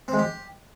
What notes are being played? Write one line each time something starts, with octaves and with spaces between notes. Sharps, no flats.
C4
G#3
G4